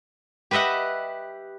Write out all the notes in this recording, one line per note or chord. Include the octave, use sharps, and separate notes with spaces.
G4 B4 D#5 E5 F#5